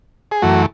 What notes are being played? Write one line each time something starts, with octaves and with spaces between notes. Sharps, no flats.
G#4
F#2 E3 A3 F#4